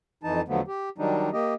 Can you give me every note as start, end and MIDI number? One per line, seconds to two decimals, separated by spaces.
0.24 0.41 41
0.24 0.41 52
0.24 0.41 63
0.24 0.41 81
0.48 0.61 40
0.48 0.61 50
0.48 0.61 53
0.48 0.61 54
0.48 0.61 57
0.48 0.61 59
0.68 0.89 67
0.98 1.30 51
0.98 1.30 54
0.98 1.30 55
0.98 1.30 62
0.98 1.30 63
1.33 1.54 58
1.33 1.54 67
1.33 1.54 75